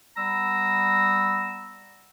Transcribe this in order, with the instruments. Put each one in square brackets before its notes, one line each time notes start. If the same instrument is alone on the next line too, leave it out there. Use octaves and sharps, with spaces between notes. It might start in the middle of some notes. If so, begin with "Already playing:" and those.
[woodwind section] G3 B3 A#5 E6